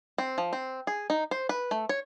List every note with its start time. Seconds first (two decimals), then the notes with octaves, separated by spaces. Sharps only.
0.18 C4
0.38 F3
0.53 C4
0.87 G#4
1.10 D#4
1.31 C5
1.49 B4
1.71 A3
1.89 C#5